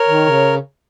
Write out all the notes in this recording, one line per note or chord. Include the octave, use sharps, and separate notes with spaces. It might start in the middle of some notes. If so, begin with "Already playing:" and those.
Already playing: A#4 C#5
D#3
C#3